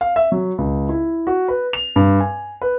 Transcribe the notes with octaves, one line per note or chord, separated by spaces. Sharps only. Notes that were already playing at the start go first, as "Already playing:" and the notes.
F5
E5
F#3
C#2
E4
F#4
B4
F7
G2
G#5
B4